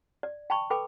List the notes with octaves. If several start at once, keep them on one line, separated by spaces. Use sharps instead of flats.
D5
G5 A5 B5 C#6
A4 B4 G5 B5 D6